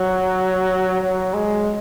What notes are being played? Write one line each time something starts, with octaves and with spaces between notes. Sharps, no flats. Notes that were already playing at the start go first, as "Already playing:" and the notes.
Already playing: F#3
F#3
G#3